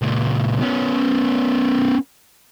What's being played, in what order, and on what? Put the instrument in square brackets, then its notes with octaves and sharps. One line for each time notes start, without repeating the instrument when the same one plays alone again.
[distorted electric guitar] C#2 A#2
B3 C#4